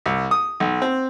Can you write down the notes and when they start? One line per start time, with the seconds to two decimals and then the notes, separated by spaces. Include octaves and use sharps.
0.06 C2
0.31 D#6
0.60 B1
0.82 C4